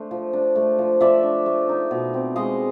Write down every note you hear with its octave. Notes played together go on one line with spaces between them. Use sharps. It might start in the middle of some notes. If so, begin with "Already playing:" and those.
Already playing: A3 D4 C5
F3
D4
A3
F3
F3 D5 E5
D4
A3
D#4
B2
C4
G#3 D#5 F5